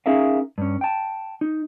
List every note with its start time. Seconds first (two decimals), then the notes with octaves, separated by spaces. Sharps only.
0.06 C#4 D#4 G#4 A#4 E5 F5
0.58 G2 C#4
0.81 G5 A5
1.41 D#4